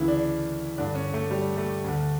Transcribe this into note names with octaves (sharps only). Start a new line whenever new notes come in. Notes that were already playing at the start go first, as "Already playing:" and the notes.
Already playing: D2 C#3 E3 E4
D4
G2 D3 D4
C#4
A3
G3
A3
D2 D3